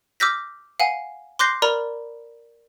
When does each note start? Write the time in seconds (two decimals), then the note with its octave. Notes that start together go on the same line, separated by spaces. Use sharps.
0.20 D6 E6 F6 G6 A#6 B6
0.80 F5 F#5 G#5
1.39 C6 D6 F#6 G6 A#6 C7
1.62 A#4 D5 A#5 B5 F6